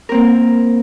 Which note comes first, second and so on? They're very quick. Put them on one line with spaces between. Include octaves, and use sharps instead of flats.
A#4 C4 A#3